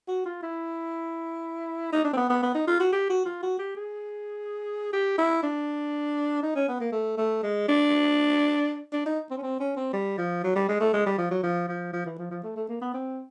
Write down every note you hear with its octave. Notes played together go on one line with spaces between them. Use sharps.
F#4
F4
E4
D#4
D4
C4
B3
B3
B3
D#4
F4
F#4
G4
F#4
F4
F#4
G4
G#4
G4
E4
D4
D#4
C#4
B3
A#3
A3
A3
G#3
D4
D4
D#4
C4
C#4
C4
C#4
C4
G3
F3
F#3
G3
G#3
A3
G#3
G3
F3
F#3
F3
F3
F3
E3
F3
F3
A3
A3
A#3
B3
C4